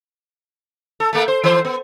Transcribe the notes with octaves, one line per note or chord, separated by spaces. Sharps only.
A4
A3 A#3
C5
E3 C5
B3